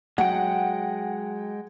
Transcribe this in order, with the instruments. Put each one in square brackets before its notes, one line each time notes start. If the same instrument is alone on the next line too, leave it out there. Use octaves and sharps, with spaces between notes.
[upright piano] F#3 [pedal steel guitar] G#3 G5 [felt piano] F#5